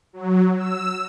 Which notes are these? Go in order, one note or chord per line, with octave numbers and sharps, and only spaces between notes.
F#3
E6